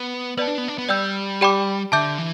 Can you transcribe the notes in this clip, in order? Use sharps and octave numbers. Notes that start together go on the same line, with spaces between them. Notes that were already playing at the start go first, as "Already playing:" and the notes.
Already playing: B3
B3 B4 D5 A5
D4
B3
D4
B3
G3 D5 G5 E6 G6
G4 D5 G5 B5 D6
D3 E5 A5 D6 G6
E3